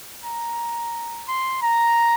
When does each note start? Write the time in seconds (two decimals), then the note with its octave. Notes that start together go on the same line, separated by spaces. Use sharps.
0.24 A#5
1.28 C6
1.62 A#5